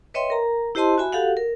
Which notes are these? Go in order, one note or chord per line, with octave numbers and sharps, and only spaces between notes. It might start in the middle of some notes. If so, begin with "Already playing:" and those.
B4 C#5 D#5 E5 G5 C6
A#4 A#5
E4 G4 C5 D#5 A5 C6
F#4 E5 G#5 B5
F#4 G4 A4 F5 F#5
A#4